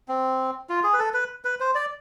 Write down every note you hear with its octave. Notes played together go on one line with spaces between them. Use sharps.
C4
F4
G#4
B4
A4
B4
B4
C5
D5